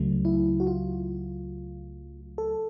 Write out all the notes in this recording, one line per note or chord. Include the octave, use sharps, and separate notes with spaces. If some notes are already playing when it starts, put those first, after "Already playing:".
Already playing: C#2 C#3 F#3 A3
E4
F#4
F4
A4